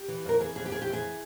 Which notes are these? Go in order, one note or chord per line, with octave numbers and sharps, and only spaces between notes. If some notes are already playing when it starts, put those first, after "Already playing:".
Already playing: G4
E3
F2 A#4
E3 G#4
F2 G#4
G4
F2 G#4
G4
E3
G#4